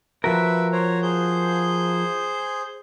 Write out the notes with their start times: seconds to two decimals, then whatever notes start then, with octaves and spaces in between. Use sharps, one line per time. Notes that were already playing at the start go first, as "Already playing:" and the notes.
0.24 F3 F#4 A#4 B4 E5
0.72 C5 C#5 A#5
1.02 G#4 C5 G6